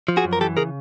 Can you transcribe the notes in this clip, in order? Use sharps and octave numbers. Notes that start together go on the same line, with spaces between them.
F3
F#4 G#4
F#2
A#4
E3 G4 A4
C#3 G#4 A#4